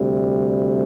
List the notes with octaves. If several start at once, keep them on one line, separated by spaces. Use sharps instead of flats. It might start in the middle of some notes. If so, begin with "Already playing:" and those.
Already playing: D2 C3 G3